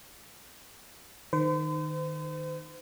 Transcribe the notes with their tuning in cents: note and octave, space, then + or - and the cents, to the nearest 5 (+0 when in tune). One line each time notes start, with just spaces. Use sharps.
D#3 -15 C5 -40